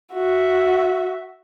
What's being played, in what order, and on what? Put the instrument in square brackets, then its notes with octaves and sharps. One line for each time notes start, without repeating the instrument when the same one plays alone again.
[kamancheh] F#4 E5